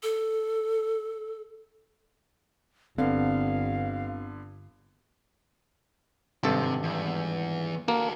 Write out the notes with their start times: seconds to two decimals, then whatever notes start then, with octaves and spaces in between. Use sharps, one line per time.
0.03 A4
2.98 G1 D3 B3 C4 F5
6.43 G#1 G2 C3 A4
6.83 E2
7.88 A#3 F#4 A4